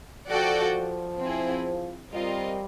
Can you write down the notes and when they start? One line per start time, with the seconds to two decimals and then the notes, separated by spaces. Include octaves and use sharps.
0.29 F3 F#4 A4 D5 G5
1.20 C4 E4 G#4
2.12 G3 C4 F4 A#4 D#5